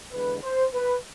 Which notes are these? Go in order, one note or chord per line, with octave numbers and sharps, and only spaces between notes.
E2 D3 G#3 B4
C5
B4